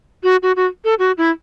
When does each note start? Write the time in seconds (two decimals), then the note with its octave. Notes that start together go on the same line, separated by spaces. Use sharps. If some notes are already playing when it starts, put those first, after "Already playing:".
0.24 F#4
0.43 F#4
0.56 F#4
0.85 A4
0.99 F#4
1.18 E4